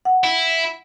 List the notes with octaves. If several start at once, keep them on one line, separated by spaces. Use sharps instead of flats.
F#5
E4